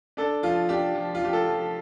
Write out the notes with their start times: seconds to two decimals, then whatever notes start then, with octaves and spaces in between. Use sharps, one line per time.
0.17 D4 A4
0.43 F3 F4
0.69 D4 G4
0.94 F3
1.15 F4
1.20 F3 G4
1.33 A4
1.46 F3